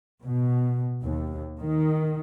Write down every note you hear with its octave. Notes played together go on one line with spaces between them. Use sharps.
B2
D#2
D#3